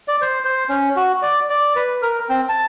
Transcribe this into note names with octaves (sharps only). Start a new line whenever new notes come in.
D5
C5
C5
C#4
F#4
D5
D5
B4
A#4
C4
A5